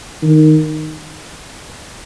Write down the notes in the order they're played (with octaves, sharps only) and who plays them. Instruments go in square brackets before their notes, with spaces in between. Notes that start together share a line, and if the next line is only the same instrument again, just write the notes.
[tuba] D#3